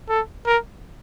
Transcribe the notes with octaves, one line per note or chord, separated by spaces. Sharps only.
A4
A#4